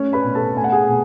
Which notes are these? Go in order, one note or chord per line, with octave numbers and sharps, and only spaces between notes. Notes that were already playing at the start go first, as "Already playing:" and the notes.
Already playing: A3 C#4 C#5
B4 B5
B2
A4 A5
A3 G#5
F#5
G#4 G#5
B2